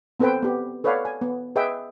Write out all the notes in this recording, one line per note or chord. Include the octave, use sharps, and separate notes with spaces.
B3 C4 A4 B4 C5 G5
B3 G4
A4 B4 C#5 D5 F5 F#5
G#5
B3
G#4 B4 D#5 E5 G5